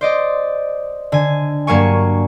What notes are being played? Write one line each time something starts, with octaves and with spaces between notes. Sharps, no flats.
C5 D5 D#5
D3 G#5
G2 F#3 A#3 G#5 C#6